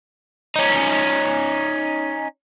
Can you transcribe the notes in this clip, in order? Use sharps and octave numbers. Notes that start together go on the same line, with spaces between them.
C#4 D#4